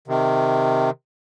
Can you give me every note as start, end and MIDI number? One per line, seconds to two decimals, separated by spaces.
0.08 0.90 48
0.08 0.90 51